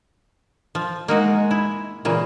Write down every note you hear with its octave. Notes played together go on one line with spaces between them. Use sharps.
F3
G#3 A#3 D#4 F#4
E4
A#2 C#3 E3 A#3